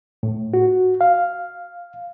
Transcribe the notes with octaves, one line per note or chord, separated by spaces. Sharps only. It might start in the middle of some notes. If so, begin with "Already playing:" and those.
A2
F#4
F5